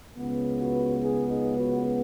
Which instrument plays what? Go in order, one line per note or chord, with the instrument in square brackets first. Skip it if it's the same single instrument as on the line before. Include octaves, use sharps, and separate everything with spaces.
[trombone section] C#2 C#3 B3
F#4 B4
D#4 G#4
D#4 G#4
F#4 B4